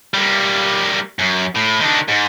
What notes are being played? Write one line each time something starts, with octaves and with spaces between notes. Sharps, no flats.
G3 A#3
F#2
A2
D#3 D4
G#2